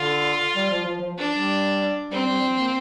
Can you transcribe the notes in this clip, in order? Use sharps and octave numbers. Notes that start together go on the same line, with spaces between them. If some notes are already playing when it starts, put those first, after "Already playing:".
Already playing: D3 F4
G3
F3
F3
F3
D4
G3
G3 C4
G3
F3
A#3